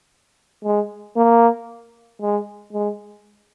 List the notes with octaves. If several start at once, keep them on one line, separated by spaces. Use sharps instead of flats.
G#3
A#3
G#3
G#3